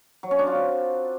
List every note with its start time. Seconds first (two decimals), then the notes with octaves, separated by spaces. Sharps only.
0.23 F#3
0.31 C#4
0.39 D4
0.47 F4
0.55 C4